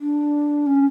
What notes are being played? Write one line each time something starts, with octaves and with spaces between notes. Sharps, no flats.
D4
C#4